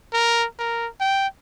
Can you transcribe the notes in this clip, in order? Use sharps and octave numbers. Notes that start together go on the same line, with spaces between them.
A#4
A#4
G5